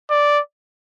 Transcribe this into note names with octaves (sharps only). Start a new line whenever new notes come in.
D5